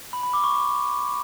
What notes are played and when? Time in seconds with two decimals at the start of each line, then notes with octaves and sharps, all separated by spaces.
0.13 B5
0.23 B5
0.33 D6
0.44 C#6